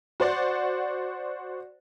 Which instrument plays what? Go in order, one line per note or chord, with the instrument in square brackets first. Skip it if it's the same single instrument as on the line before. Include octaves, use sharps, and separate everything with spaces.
[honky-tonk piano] F#4 C5 D5 F#5